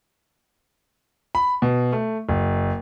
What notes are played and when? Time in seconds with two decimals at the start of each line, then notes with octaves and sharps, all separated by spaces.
1.35 B5
1.62 B2
1.93 A3
2.29 F#1